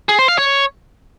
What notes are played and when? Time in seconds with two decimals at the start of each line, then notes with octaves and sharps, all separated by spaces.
0.09 G#4
0.19 C5
0.28 F5
0.38 C#5